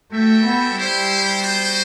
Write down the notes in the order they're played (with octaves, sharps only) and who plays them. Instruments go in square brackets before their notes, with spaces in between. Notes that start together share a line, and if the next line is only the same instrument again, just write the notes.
[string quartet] A3 [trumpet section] F#4 A4 E5 G5
[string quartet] B3
[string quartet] G3 [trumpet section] E4 G4 C5 E5
[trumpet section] B3 F#4 C5 G5